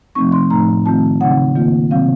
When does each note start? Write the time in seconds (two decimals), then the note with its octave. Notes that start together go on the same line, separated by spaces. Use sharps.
0.15 C3 F3 A3 C4 D#4 C#6
0.32 C6
0.50 A2 F3 A3 D#4 A#5
0.86 D#3 A3 C4 F4 A5
1.21 C#3 F#3 C4 D#4 F#5
1.56 D#3 A#3 F4
1.91 C3 D#3 F#3 C4 F5